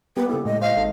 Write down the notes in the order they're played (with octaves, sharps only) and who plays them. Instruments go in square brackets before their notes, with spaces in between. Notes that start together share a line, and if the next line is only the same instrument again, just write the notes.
[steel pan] G3 A#3 G4 [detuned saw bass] B3 [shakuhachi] B4
[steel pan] C#3 E4 [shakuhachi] A4
[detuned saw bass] A2 [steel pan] G#3 [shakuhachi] D#5
[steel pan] C5 [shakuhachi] D#5 [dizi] F5
[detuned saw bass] G#1 [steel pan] D#4 A4